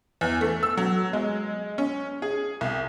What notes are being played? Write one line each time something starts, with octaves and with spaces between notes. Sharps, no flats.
E2
A3
E6
F#3
G#3
C#4
G#4
C2